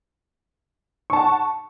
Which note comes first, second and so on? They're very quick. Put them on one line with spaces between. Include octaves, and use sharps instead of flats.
C#6 A5 F#5